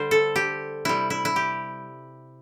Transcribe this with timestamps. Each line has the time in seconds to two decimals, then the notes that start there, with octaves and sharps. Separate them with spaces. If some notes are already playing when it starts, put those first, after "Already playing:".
Already playing: D3 G3 C5
0.11 A4
0.36 G4
0.85 C3 G3 E4
1.10 E4
1.25 E4
1.36 G4